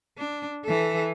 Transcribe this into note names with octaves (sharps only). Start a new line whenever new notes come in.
D4
E3 A4